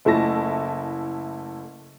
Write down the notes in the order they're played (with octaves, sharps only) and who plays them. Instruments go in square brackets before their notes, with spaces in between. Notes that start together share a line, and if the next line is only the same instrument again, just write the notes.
[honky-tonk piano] F#1 A3 E4 A5 A#6